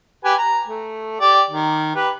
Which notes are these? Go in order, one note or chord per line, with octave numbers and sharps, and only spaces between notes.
G4 B4 G#5
A#5
A3
G4 D5 G5
D#3
G4 B4